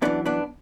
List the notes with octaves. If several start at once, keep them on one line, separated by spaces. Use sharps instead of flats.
F#2 E3 B3 D4
B3 D4